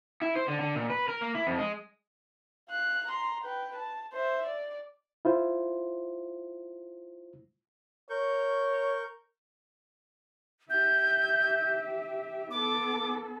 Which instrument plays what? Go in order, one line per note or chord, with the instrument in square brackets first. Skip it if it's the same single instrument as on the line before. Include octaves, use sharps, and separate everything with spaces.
[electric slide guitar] E4
C5
D3
D3
A#2
B4
A#4
A#3
E4
F2
G#3
[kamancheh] F5 F#6
A#5 C6
B4 G5
A5
C5 E5
D5
[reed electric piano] E4 F4 C5
[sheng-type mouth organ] A#4 C#6 G6 [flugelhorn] C#5
[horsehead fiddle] G4 E5 [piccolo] G6
[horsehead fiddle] B3 A4 [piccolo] D6